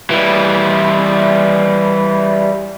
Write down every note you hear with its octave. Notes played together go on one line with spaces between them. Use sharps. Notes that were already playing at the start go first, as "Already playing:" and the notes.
E3 G3